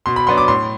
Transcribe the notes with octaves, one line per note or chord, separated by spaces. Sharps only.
B2 C6
B5
F#3 B3 D4 C6
D6
A2 C6